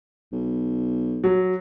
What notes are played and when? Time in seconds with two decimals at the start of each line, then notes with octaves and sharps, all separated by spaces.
0.32 B1
1.24 F#3